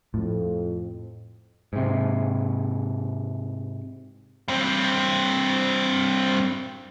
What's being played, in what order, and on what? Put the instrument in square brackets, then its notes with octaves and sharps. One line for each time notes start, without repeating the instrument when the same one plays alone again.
[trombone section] F2 [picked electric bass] A2
[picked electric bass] G#2 C3
[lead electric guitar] G2 C4